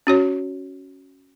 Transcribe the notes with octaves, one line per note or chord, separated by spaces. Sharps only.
C#4 F#4 C#5